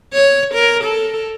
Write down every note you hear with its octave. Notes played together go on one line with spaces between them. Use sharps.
C#5
A#4
A4